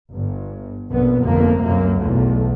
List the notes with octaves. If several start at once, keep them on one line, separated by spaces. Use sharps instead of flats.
G1 G2
A#1 F2 B2 B3
G1 F2 F3 A3 A#3
C#2 F#2 C3 A#3
B1 E2 A3